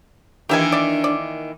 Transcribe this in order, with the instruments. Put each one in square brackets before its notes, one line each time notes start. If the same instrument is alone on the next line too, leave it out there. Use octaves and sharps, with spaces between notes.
[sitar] D#3 E3 A#3 [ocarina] D4 [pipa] G4 E5 G#5
[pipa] D5 E5
D5